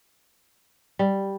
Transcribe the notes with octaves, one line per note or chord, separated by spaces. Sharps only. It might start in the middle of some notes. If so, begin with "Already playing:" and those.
G3